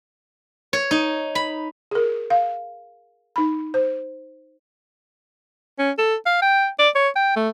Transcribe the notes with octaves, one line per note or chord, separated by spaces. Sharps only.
C#5
D#4
B5
G#4 A#4
F5
D#4 B5
C5
C#4
A4
F5
G5
D5
C#5
G5
A3